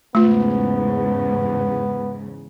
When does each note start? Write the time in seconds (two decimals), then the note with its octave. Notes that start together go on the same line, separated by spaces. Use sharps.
0.15 E2 G#2 C#3 A3 B3 F4